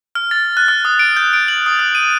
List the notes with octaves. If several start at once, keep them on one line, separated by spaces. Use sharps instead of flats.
F6
A6
F#6
F6
D#6
D7
G6
D7
F#7
D#6
F#6
D#7